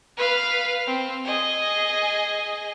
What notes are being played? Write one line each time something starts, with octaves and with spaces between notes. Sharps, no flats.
B4 F5
C4
G#4 D#5